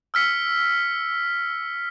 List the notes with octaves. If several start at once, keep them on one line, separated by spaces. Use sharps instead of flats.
E6 F6 B6 C#7